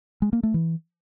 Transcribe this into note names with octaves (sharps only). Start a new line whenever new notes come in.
G#3
A#3
A3
E3